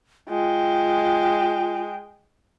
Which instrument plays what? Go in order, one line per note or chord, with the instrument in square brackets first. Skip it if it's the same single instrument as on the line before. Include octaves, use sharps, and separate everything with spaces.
[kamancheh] G#3 G5 [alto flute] F4